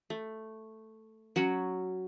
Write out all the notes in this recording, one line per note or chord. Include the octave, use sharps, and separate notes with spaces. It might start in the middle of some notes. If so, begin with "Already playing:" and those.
A3
F#3 C#4 F#4